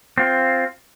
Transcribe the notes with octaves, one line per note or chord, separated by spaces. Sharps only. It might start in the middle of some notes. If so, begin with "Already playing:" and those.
C4 F4